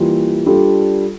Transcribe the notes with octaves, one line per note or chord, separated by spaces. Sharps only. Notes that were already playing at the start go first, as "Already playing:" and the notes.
Already playing: E3 G3 A#3 F4
G3 D4 F4 A4